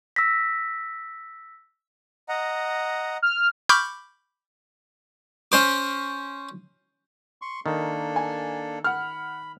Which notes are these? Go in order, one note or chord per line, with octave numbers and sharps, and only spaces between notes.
E6 A#6 B6
D#5 F#5 A#5
F6
B5 C#6 D6 F6 G6
C#4 C5 D6
C6 C#6
D#3 A#3 D4 A4
G#5
F#5 B5 F6